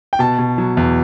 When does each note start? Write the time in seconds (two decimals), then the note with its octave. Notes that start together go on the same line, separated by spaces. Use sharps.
0.13 G5
0.19 B2 A5
0.39 B2
0.58 F#3
0.77 E2